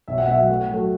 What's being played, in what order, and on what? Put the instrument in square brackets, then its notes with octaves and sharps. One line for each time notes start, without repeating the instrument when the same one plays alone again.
[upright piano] B1 [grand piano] E5
[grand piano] F#5
[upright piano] B2 F#3 [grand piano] E5
[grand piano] F#5
[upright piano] A2
F#3 A3